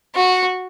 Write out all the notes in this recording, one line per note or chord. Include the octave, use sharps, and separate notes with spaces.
F#4